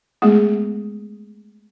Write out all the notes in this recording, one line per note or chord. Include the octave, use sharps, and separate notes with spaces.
G#3 A3 B3 G#4